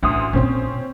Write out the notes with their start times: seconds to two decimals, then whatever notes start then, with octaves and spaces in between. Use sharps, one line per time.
0.03 A1 D2 C6 D#6
0.33 A#2 D3 C4 C#4